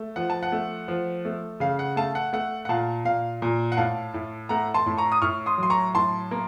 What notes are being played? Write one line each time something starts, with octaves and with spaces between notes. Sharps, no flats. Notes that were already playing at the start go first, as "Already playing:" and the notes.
Already playing: A3
F3 F#5
A5
F#5
A3
F3
A3
C#3 F5
F#5
A3 F5 A5
F#5
A3 F#5
F#5
A#2 F5 A5
A#2 F5
A#2
F#5
A2 F5 A5
A2
A3 F#5 A#5
A5 C6
A2
A#5 C#6
D#6
A2 C#6 F6
C6 D#6
F#3
C6
A#5 C#6
A2 A5 C6
A#3